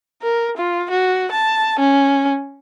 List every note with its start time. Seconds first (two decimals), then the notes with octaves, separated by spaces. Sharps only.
0.22 A#4
0.57 F4
0.90 F#4
1.32 A5
1.79 C#4